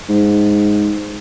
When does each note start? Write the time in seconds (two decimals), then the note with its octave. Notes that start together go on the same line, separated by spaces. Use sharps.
0.09 G#2